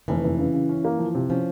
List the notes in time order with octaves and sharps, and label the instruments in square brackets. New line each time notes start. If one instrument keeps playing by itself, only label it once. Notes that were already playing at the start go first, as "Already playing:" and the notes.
[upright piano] F1 [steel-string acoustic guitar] E3
[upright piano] F1
C#3
C#3
C#4
A#3
F3
C3
[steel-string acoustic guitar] F3 [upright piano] C#4